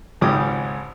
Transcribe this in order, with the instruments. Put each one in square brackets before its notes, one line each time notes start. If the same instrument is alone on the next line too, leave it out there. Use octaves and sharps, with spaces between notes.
[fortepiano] G#1 C#2 G#2 G4 D6 D#6